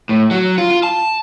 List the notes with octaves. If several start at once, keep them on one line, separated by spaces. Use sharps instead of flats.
A2
F#3
F4
F4
A5